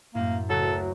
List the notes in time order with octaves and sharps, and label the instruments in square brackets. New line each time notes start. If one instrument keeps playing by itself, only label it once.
[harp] F#2 A2 [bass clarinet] A#3
[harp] F#1 C#5 F#6 [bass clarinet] D2 [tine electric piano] F#3 [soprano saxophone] A4
[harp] A#4